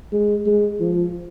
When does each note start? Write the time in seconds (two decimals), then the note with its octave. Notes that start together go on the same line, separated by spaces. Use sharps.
0.12 G#3
0.46 G#3
0.80 F3